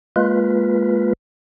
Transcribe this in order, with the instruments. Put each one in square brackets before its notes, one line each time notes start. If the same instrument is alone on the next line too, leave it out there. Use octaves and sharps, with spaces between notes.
[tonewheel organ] G#3 A#3 F4 B4